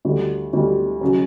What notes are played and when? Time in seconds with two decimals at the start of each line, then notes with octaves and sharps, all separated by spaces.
0.05 D2 D3 G3
0.53 D2 D3 G3
1.01 C#3 F#3